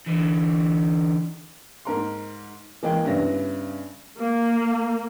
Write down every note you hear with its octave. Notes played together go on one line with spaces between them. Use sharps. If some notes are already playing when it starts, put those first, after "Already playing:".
D3 E3
G#2 A#4 C6
E3 G#3 A#3 G5
G2 C#3 B3 E4 A#6
A#3